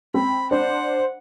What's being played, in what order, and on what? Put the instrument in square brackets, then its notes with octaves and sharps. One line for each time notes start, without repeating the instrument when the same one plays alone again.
[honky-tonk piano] C4 [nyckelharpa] B5
[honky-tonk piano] D4 [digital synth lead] C5 [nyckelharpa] F#5